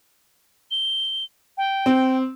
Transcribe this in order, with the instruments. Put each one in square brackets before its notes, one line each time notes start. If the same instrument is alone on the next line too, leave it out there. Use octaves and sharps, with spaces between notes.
[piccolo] G7
G5
[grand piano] C4